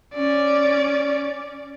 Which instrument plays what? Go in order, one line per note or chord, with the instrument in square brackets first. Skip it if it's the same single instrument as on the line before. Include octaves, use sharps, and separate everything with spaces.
[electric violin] C#4 D5